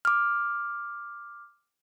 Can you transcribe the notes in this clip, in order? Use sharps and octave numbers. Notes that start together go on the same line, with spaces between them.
D6 F6